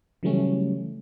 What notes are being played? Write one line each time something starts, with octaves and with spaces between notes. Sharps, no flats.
C#3 E3 F#3 G3 A3 C#4